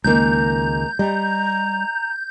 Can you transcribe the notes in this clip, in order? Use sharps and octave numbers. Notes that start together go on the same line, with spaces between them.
C#2 D#3 G#3 A#3 A#5 G6
G3 D#5 A#5